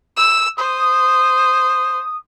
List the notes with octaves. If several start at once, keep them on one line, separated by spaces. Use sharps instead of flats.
E6
C5 D#6